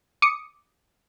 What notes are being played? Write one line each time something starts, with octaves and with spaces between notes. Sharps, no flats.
D6 D#6 C#7